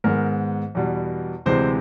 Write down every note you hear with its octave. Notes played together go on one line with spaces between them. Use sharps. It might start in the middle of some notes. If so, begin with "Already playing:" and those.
G#2 D#3 G#3 B3 A#4
E2 B2 G3
D2 C3 E3 G#3 C4 C5